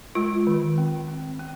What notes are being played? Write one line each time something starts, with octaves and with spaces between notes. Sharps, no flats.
G#3 F4
D#3
C4
C4
C4